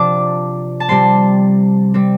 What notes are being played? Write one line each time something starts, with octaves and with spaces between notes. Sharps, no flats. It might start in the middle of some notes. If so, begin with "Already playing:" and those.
Already playing: C3 F3 D4 F5 A5 D6
A5
C3 G3 C4 C6
G3 C4